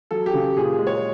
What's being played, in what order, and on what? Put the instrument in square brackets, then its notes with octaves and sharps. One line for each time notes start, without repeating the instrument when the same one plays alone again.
[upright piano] F#3 A4
G4
C#3
A#2 G#4
G#3
C#5